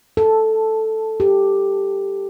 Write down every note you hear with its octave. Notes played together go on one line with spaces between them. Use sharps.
A4
G4